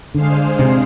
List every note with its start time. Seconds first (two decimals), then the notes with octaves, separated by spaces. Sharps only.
0.14 D3 G#3 D4 G#4 C5 F5
0.59 C3